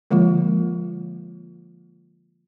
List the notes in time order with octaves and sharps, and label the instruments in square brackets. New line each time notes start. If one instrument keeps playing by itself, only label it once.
[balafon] D3 F3 G#3 A#3 F4